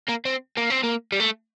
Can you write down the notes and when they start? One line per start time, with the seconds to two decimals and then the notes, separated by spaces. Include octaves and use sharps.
0.09 A#3
0.25 C4
0.57 A#3
0.70 C4
0.83 A#3
1.12 G3
1.20 A3